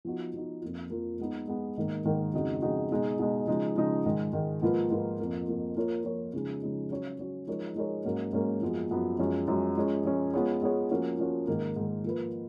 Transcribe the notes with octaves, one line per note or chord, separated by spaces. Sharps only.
F3 B3 D#4 F#4
F3 B3 D#4 F#4
F2 F3 A#3 F4
F2 F3 A#3 F4
G#3 B3 D#4
G#3 B3 D#4
G#2 D#3 A#3 D#4
G#2 D#3 A#3 D#4
F2 C#3 G#3 D#4 F#4
F2 C#3 G#3 D#4 F#4
B2 G#3 D#4
B2 G#3 D#4
C#3 F3 G#3 D#4
C#3 F3 G#3 D#4
G#2 D#3 G#3
G#2 D#3 G#3
G#2 F3 A#3 F4 B4
G#2 F3 A#3 F4 B4
F2 F3 A#3
F2 F3 A#3
F3 A#3 F4 A#4 C#5
F3 A#3 F4 A#4 C#5
C#3 F3 G#3 D#4
C#3 F3 G#3 D#4
F#3 C#4 F#4 C#5
F#3 C#4 F#4 C#5
F3 G#3 D#4 A#4 C#5
F3 G#3 D#4 A#4 C#5
G#2 F#3 A#3 C#4
G#2 F#3 A#3 C#4
F#2 F3 G#3 B3
F#2 F3 G#3 B3
F#2 F3 G#3 C#4
F#2 F3 G#3 C#4
F3 G#3 C#4
F3 G#3 C#4
G#3 B3 F4 G#4 C#5
G#3 B3 F4 G#4 C#5
F3 A#3 C#4 F#4
F3 A#3 C#4 F#4
G#2 D#3 A#3
G#2 D#3 A#3
F3 A#3 F4 B4